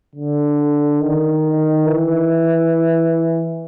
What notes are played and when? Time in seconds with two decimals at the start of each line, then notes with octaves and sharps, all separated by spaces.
0.16 D3
1.01 D#3
1.87 E3